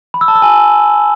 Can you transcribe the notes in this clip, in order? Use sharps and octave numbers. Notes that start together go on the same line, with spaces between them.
B5
E6
A5
E6
G#5